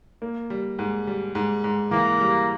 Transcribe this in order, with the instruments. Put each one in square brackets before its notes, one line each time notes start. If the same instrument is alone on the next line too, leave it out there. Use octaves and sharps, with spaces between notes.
[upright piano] A#3
G3
G#2
G3
G#2
G#2
[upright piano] E3 [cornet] A#3
[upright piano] G3